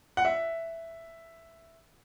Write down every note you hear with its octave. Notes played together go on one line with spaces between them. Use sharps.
F#5
E5